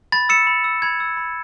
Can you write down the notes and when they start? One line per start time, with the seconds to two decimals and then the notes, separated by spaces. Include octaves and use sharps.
0.12 B5 A6
0.29 E6 C#7 E7
0.47 B5
0.64 E6
0.82 B5 G#6
1.00 E6
1.17 B5